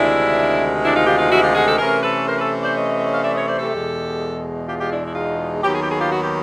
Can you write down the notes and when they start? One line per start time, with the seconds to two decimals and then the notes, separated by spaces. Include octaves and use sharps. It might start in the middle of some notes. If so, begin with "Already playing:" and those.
Already playing: D2 C3 D#3 G#3 D4 E4
0.83 D4 E4
0.95 D#4 F4
1.06 F4 G4
1.18 D#4 F4
1.30 E4 F#4
1.42 F4 G4
1.54 F#4 G#4
1.66 G4 A4
1.78 C3 E3 A3 C#4 G#4 A#4
2.02 A4 B4
2.27 A#4 C5
2.38 A4 B4
2.63 C5 D5
2.75 C#5 D#5
3.12 F5
3.23 D5 E5
3.35 C#5 D#5
3.47 C5 D5
3.58 G4 A4
3.70 E2 B2 G#3
4.67 F4 G4
4.79 F4 G4
4.91 D4 E4
5.06 E4
5.15 D#4 F4
5.63 D#2 D#3 F#3 B3 G4
5.73 G#4
5.81 G4
5.89 G#4
5.99 F4 G4
6.12 F#4
6.23 G4